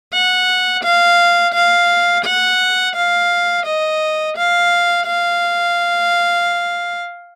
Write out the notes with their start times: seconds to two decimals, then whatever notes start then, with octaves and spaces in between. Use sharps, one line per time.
0.13 F#5
0.84 F5
1.54 F5
2.25 F#5
2.96 F5
3.66 D#5
4.37 F5
5.06 F5